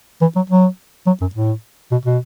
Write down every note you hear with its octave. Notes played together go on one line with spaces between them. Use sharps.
E3
F#3
F#3
F#3
F#2
A2
B2
B2